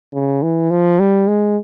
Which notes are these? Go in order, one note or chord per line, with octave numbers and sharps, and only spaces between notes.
C#3
E3
F3
G3
G#3